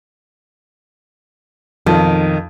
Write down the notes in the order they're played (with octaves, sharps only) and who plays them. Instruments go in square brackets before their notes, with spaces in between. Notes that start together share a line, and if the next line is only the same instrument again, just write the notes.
[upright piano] B1 F2 [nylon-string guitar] D#3